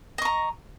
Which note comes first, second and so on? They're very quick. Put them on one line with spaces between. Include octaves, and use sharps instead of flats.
D#5 C#6 A#5